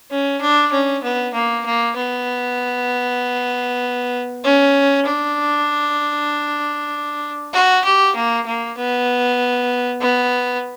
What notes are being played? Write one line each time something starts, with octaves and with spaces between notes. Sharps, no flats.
C#4
D4
C#4
B3
A#3
A#3
B3
C#4
D4
F#4
G4
A#3
A#3
B3
B3